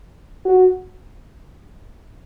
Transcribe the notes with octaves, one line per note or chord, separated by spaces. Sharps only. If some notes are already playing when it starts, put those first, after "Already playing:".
F#4